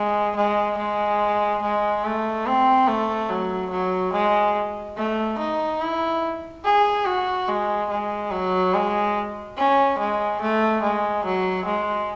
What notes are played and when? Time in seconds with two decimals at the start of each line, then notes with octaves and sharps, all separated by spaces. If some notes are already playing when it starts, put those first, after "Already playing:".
Already playing: G#3
0.36 G#3
0.78 G#3
1.62 G#3
2.04 A3
2.46 C4
2.88 A3
3.29 F#3
3.71 F#3
4.13 G#3
4.97 A3
5.38 D#4
5.81 E4
6.64 G#4
7.05 F#4
7.47 G#3
7.90 G#3
8.31 F#3
8.74 G#3
9.57 C#4
9.98 G#3
10.41 A3
10.82 G#3
11.25 F#3
11.65 G#3